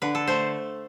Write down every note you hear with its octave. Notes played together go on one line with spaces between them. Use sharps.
D3 B4
A4
A3 C5